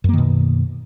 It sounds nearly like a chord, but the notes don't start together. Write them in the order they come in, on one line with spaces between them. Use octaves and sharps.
F#2 A#3 D#3 B2